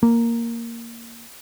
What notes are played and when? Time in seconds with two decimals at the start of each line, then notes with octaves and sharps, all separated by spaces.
0.03 A#3